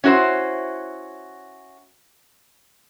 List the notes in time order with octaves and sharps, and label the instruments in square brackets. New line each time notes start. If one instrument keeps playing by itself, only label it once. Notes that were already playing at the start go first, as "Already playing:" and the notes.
[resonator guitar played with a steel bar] C#4 E4 F#4 B4 C5